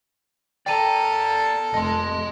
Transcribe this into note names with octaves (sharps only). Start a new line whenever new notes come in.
A4 A#4 D5 G5 A#5 D#7
F1 D#5 A5 C6